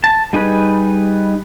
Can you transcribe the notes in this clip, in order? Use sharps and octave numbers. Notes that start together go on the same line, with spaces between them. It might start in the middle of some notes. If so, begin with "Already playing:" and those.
A5
G3 D#4 G#4 B4